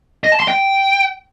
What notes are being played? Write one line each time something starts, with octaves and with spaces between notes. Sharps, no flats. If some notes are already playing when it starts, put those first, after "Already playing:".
D#5
A5
C6
G5